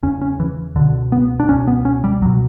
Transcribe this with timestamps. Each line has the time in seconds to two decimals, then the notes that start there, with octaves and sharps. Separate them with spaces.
0.03 E2 C#3 C#4
0.21 C#4
0.40 E3
0.76 C#2 B2 D3
1.12 B3
1.40 D4
1.49 C#2 B2 C#4
1.67 B3
1.85 C#4
2.04 G3
2.22 C#2 F#3
2.25 B2